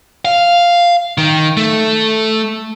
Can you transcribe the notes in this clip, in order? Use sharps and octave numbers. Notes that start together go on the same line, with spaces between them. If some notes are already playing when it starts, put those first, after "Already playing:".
F5
D#3
A3